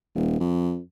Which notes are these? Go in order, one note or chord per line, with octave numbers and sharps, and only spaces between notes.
D#1
F2